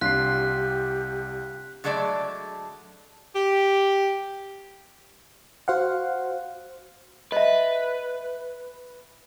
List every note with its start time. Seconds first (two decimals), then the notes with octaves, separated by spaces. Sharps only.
0.01 C2 D4 F4 G4 F#6 B6 C7
1.84 D3 F#3 G#3 A3 D5
3.34 G4
5.68 F#4 C5 F5 F#5
7.32 B4 D#5 E5